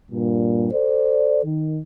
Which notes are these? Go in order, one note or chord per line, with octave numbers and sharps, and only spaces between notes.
G2 A#2
A4 C5 D5
D#3